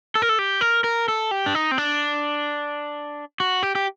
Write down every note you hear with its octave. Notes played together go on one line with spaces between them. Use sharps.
A4
A#4
A4
G4
A#4
A#4
A4
G4
D4
D#4
C4
D4
F#4
G4
G4